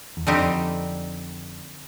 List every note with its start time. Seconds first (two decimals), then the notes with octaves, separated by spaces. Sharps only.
0.17 E2
0.27 F2 D3 G3 C4 D#4 G4